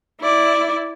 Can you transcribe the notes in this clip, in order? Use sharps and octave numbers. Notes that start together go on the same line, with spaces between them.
E4 D5